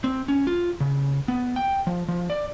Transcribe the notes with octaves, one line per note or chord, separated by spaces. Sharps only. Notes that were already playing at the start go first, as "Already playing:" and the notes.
C4
C#4
F4
C#3
B3
G5
F3
F3
D5